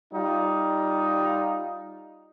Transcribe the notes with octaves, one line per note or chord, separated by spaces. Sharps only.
G3 D#4 F4